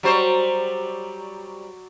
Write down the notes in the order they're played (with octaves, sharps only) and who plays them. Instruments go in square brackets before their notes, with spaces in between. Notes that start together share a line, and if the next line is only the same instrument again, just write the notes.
[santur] F#3 D5 C#6 [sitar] G3 C5